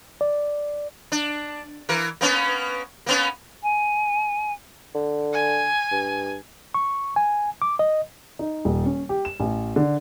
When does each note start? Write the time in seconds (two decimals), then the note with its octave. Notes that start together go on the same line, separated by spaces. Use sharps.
0.21 D5
1.12 D4
1.89 E3 A#4
2.21 A#3 B3 C#4
3.06 A#3 B3 C#4
3.62 G#5
4.95 D3
5.33 G#5
5.91 G2
6.74 C#6
7.16 G#5
7.62 D6
7.79 D#5
8.39 D#4
8.65 D#1
8.86 C#4
9.09 G4
9.25 E7
9.40 A1
9.76 D3